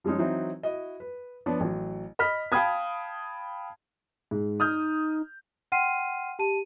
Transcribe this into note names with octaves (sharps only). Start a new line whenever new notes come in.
F3 G3 G#3 C#4 D#4
E3 F#3 C4 D#4 E4 F#4
E4 F#4 D#5
B4
F3 B3 D4 C#5
A1 F#3
D#5 B5 F6 B6
F5 G5 A5 B5 D#6 G#6
G#2
D#4 D#6 F6 G6
F#5 G5 C6 F6 C7 D#7
G4 A5 D#7